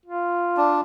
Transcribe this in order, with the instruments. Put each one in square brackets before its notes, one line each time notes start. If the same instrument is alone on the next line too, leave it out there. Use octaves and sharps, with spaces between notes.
[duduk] F4
[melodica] D4